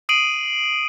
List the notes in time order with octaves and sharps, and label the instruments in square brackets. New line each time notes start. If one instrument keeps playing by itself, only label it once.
[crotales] D#6 C7 D7 D#7 F#7